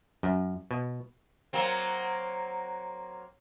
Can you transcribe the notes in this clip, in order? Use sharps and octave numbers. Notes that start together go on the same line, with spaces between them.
F#2
B2
F#3 A#3 C4